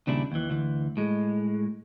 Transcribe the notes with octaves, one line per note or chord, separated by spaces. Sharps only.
D#2 A#2 C#3 G3 D4 E4
D#2 E3
D2 E3
A2 G#3